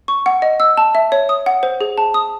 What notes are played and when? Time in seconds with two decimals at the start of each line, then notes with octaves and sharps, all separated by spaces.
0.08 C#6
0.26 F#5
0.42 D#5
0.60 E6
0.77 A5
0.95 E5
1.12 C#5
1.29 D#6
1.46 F#5
1.63 C5
1.81 G#4
1.98 A5
2.14 D#6